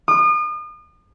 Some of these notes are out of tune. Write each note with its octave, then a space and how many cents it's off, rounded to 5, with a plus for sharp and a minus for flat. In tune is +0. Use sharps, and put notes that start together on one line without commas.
D#6 -40